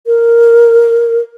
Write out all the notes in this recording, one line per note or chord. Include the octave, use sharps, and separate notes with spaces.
A#4